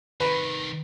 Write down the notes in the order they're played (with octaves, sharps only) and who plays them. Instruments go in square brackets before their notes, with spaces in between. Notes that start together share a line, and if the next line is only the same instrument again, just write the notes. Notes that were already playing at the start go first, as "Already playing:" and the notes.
[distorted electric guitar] C2 D#3 [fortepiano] B4